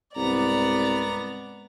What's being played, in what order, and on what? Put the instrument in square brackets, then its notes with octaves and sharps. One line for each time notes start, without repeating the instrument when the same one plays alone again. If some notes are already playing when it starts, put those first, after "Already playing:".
[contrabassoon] C2 [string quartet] G#2 D5 [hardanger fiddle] B3 A#5